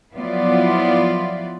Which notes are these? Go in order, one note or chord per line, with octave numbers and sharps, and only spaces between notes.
F3 F#3 B3 E4 F4 D5